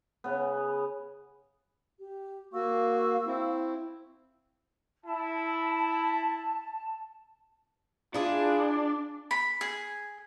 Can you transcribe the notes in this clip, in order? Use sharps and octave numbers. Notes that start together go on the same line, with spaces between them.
C#3 B3
G4
A#3 F#4 F5 C#6 E6
C4 E4
E4 A5
D4 E4 F4 G#4
B5
G#4